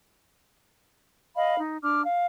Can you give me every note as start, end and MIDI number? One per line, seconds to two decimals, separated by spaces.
1.35 1.57 75
1.35 1.57 77
1.35 1.57 83
1.58 1.76 63
1.82 2.03 62
1.82 2.03 86
1.82 2.03 89
2.04 2.26 77